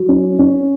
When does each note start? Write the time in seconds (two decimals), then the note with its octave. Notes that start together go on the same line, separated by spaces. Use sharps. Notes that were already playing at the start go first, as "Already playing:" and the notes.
Already playing: F#3
0.09 C#4
0.39 C#4